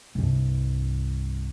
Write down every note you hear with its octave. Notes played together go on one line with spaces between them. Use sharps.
C2 G2